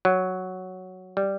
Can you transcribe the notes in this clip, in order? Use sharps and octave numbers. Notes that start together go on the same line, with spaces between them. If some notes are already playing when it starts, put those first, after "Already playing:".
F#3
G3